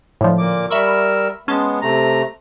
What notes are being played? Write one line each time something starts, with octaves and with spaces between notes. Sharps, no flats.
A2 D3 F3
A#2 A#3 D6
G3 A#4 E5 B5 C#6 E6
G#3 B3 C#4 A5 C6
C3 A3 A#5